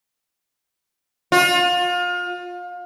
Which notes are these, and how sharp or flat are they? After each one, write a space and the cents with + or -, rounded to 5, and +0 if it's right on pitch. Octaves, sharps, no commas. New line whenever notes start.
F4 +30